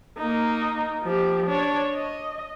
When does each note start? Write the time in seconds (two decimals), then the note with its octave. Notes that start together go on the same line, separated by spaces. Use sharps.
0.18 A#3 D#4
1.04 F3 G4
1.47 D4 C#5
1.94 D#5